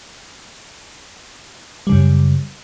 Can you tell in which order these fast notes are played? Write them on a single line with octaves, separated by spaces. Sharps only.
G3 C#3 F#2